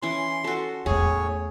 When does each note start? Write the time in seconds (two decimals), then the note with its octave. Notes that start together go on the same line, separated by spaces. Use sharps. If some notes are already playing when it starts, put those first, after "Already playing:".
0.02 E3 C#4 C6
0.44 F#4 A4
0.86 E2 A2 A3 G#4 C#5